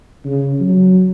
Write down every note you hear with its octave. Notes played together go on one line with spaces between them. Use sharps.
C#3
F#3